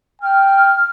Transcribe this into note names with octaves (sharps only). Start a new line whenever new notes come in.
G5 F6